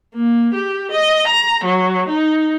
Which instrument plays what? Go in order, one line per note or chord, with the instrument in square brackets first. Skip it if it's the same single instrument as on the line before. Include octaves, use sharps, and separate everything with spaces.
[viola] A#3
G4
D#5
A#5
F#3
D#4